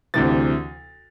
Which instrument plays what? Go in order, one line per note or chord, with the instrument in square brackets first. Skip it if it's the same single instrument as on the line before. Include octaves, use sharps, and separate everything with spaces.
[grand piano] D2 C3 E3 A6